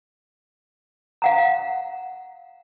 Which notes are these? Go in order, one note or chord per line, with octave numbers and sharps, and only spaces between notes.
F5 F#5 A#5